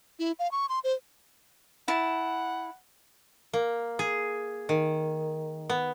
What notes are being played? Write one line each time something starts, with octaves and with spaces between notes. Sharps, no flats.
E4
F5
C#6
C6
C5
E4 F#5 A5
A#3
G#4
D#3
B3